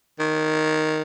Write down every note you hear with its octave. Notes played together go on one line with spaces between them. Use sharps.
D#3